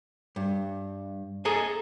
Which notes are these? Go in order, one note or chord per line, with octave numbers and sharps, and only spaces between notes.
G2
G#4 A4 D#5 G#5 A#5